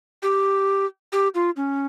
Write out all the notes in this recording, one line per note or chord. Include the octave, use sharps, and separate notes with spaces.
G4
G4
F4
C#4